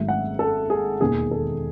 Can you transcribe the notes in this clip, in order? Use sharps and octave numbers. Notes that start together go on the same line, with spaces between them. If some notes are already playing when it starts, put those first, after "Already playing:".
Already playing: G#1 G#2 F#3 A3 E5
F#5
A4
G#4
E1 D#2 D#3 G#4
A4